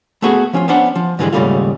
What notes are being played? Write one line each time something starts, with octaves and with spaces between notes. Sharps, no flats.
A3 B3 F#4 G#4 A4
F3 C#4 D4 F4
B3 C#4 D4 C5 F#5
F3
G#2 D3 E3 F3 G3 G#3
D#2 G#2 C#3 G3 A3 F4